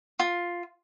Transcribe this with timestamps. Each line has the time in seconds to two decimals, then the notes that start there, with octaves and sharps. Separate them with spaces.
0.19 F4